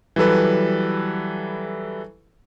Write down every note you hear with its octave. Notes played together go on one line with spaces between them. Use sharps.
E3 F#3 G3 A4 B4